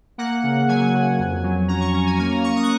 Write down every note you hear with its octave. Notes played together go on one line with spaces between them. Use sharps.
A#3 F#5
C#3
F#3 G#5
C#3
F2
F#3
C#4 A#5
C#6
C#4 A#5
G#5
A#3 G#5
A#5
A#3 C#6
D#6
F#6